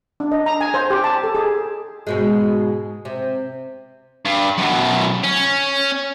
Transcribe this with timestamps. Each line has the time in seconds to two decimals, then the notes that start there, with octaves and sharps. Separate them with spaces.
0.20 D4
0.32 D#5
0.46 A#5
0.61 G#5
0.74 C5
0.90 G4
1.04 A5
1.24 A4
1.35 G#4
2.07 G#2 B2 G#3
3.05 C3
4.25 G2
4.58 F#2 B2
5.24 C#4